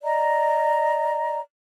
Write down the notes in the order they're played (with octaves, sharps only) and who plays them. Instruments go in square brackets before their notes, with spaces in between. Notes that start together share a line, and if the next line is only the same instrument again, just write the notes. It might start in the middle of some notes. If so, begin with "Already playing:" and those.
[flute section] D5 D#5 A#5